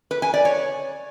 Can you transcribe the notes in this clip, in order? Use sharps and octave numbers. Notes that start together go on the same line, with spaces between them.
B4
G#5
D5
C#5